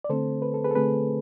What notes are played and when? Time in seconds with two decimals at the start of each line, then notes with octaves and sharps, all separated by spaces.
0.04 D5
0.09 D3 A3 C4 A4 C5
0.42 B4
0.54 A4
0.64 G#4 B4
0.71 A4
0.75 D3 A3 C4 G#4 B4